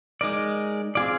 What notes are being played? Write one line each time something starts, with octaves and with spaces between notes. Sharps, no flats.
G#3 D#4 A#4 D5
C4 F4 G#4 D5